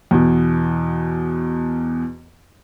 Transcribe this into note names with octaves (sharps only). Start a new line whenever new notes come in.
E2 B2